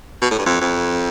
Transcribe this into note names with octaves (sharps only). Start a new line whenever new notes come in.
B2
A2
G2
F2
F2